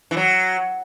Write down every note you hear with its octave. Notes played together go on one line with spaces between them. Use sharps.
E3
F#3